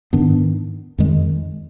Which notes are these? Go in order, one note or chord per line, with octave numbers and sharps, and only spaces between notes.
G#2 D#3 B3 D4
F2 D#3 G#3